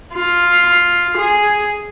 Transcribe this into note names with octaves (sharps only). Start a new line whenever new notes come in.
F4
G#4